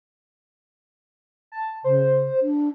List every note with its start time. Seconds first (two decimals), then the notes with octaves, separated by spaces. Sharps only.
1.52 A5
1.84 C#3 C5
2.42 D4